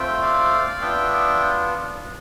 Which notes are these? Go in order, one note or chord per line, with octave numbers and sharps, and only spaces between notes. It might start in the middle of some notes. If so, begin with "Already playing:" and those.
Already playing: A3 C4 F4 E5 G5
D5 F5
B3 D4 F4 E5 G5